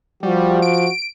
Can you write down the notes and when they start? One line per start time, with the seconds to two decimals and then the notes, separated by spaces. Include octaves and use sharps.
0.23 F3 G3 F#4
0.62 D7